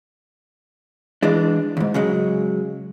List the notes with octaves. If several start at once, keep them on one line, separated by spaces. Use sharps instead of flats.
E3 G#3 D4
D#2 G#2
C#3 F#3 G#3